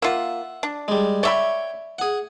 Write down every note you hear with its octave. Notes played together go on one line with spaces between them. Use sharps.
A#3 F4 E5 F#5
D4
G3 G#3
C#5 D5 E5 G5 B5 C#6
G#4 F#5